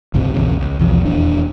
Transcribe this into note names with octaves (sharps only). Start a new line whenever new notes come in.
G1 C#2 G#2 C3
A#1 E2 C#3
C#2
B1 E2 F3
D#1 E2 D4